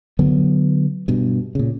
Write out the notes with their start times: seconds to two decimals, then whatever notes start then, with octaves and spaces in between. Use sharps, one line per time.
0.19 D3 F#3 B3
1.08 G2 B2
1.55 A#2 C#3